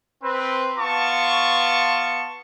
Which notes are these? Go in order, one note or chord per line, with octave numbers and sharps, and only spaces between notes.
C4 B4
B3 F4 A5 C#6